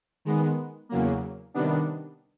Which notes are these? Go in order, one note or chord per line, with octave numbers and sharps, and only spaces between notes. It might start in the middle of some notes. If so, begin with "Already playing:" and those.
D#3 G#3 B3
E2 C#3 F#3 A#3
C3 D#3 G3 B3 D4